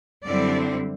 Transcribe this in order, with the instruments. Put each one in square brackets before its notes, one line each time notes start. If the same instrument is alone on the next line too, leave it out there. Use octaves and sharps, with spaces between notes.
[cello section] F#2 D3 G3 C4 E4 D5